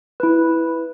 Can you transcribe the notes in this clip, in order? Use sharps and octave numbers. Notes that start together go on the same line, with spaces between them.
E4 B4